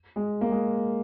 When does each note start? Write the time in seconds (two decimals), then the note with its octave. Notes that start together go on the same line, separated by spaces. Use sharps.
0.16 G#3
0.41 A#3
0.51 G#3